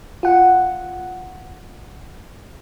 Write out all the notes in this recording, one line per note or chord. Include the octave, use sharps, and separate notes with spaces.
F4 F#5